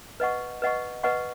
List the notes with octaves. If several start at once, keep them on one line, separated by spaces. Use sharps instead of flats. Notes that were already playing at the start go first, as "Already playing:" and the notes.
B4 D#5 F#5 C#6
B4 D#5 F#5 C#6
B4 D#5 F#5 C#6